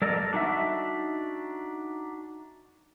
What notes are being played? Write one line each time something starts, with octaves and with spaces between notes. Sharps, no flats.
G3 A4 A#4 D5 D#5
D4 D#4 F#4 E5